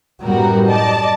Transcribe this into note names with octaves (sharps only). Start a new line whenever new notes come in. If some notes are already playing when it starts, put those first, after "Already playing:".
F#2 A2 G3 B3 F#4 A#4
D5 D#5 A5